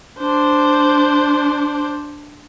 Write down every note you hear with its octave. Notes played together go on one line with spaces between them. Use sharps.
D4 C5